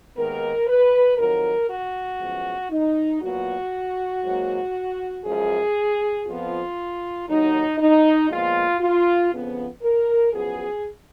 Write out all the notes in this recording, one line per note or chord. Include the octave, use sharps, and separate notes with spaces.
D#2 D#3 G#3 B3 A#4
B4
F2 D#3 F#3 A#4
F#4
F#2 F3 G#3 B3
D#4
A#2 F#3 B3 F#4
G#2 F#3 A#3
F#2 F3 G#3 G#4
F2 F3 B3 F4
D#2 D#3 F#3 D#4
D#4
A#2 F3 G#3 B3 F4
F4
F2 C#3 F3 B3
A#4
F#2 F3 B3 G#4